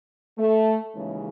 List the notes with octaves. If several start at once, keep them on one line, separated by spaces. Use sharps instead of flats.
A3
D#2 C#3 E3 G#3 C#4